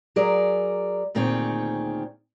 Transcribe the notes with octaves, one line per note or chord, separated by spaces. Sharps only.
F#3 G#4 A#4 D5
D2 A#2 D#3 C4 G#4 C#5